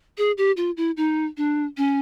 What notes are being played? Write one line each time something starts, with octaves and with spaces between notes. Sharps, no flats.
G#4
G4
F4
E4
D#4
D4
C#4